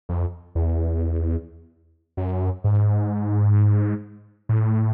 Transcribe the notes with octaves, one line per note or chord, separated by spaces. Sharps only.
F2
E2
F#2
G#2
A2